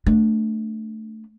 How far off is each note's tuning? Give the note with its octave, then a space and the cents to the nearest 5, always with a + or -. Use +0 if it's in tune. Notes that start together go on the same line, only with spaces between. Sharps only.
A3 +0 D4 +0